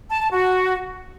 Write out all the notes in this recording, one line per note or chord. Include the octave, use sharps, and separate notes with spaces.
A5
A5
F#4